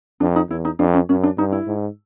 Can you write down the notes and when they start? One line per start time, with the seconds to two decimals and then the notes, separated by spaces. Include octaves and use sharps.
0.20 F2 D4
0.36 D#4
0.49 E2 E4
0.65 D#4
0.79 F2 D4
0.94 C#4
1.09 F#2 C#4
1.23 D4
1.38 G2 D#4
1.52 E4
1.67 G#2